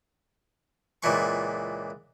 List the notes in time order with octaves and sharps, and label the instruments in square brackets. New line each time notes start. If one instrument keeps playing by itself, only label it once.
[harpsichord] C#2 A#2 E3 C#6